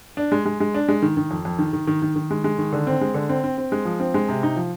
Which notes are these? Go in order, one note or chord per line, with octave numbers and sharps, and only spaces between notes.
D4
G#3
G#3
G#3
D4
G#3
D#3
D#3
F2
F2
D#3
D#3
D#3
D#3
D#3
G#3
G#3
D#3
D3
C4
G#3
D3
C4
C4
C4
G#3
F3
C4
G#3
C3
D#4
F3